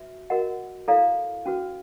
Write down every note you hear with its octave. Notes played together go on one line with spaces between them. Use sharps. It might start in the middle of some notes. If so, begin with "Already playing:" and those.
Already playing: F#4 B4 E5
F#4 A#4 D#5 F#5
E4 A4 D5 F5 A#5
C#4 F#4 B4